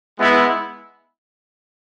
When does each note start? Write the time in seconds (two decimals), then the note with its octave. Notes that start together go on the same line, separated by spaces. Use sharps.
0.19 G#3 B3 E4